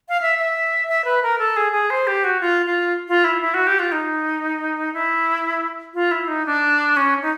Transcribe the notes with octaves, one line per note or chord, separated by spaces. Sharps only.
F5
E5
E5
E5
B4
A#4
A4
G#4
G#4
C5
G4
F#4
F4
F4
F4
E4
E4
F#4
G4
F4
D#4
E4
F4
E4
D#4
D4
C#4
D#4